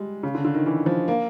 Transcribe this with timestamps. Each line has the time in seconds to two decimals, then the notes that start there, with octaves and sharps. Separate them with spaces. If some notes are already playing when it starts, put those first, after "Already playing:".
Already playing: G3 G#3
0.23 C#3
0.35 D3
0.45 D3
0.55 D#3
0.66 E3
0.86 F3
1.08 A#3